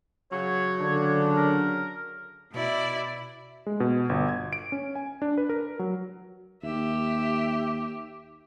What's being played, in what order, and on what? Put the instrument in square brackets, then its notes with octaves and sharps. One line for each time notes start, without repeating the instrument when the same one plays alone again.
[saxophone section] C#3 F#3 [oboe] C#5
[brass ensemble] D3 D4
[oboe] A#4
[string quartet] B2 E4 D5
[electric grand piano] G#3
B2
G1
G#6
D7
C#4
G#5
D4
B4
A#4
F#3
[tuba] D#2 [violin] G4 E5